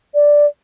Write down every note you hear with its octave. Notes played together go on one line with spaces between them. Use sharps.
D5